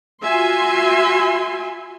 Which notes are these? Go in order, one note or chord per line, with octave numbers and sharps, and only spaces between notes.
F4 F#4 E5 G#5 C6